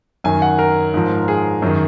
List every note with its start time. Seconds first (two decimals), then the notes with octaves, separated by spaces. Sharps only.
0.24 F#2 D#3 G#5
0.42 F#5
0.59 A#4
0.94 G#2 F3
1.28 G#4
1.62 F#2 D#3